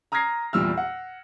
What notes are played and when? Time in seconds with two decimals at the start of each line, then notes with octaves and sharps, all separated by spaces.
0.12 A#5 D#6 F6 G#6 A#6 C7
0.53 E2 A#2 G3 E6 F6
0.77 F#5